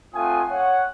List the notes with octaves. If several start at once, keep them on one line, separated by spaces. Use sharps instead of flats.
A3 C4 F4 F#5 G#5 D#6
C#5 F#5